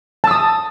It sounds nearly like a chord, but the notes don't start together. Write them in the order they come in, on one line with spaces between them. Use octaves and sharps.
A5 E6 D#6